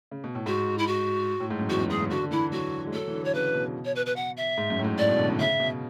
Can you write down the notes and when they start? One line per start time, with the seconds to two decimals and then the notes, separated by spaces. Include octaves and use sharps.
0.11 C#3
0.24 B2
0.35 A2
0.46 G#2 F#4
0.78 E4
0.87 F#4
1.40 A2
1.50 G#2
1.59 F#2
1.69 E2 F#4
1.80 F#2
1.90 G#2 G#4
2.00 C#3
2.10 D3 F#4
2.23 D3
2.31 E3 E4
2.51 F#3 F#4
2.87 G#3
2.92 F#3 A4
3.08 E3
3.14 D3
3.24 C#5
3.34 C#3 B4
3.54 B2
3.85 C#5
3.95 B4
4.06 B4
4.16 F#5
4.37 E5
4.57 G#2
4.70 F#2
4.79 A2
4.84 G#2
4.98 A2 D5
5.09 B2
5.19 D3
5.28 C#3
5.39 C#3 E5
5.60 B2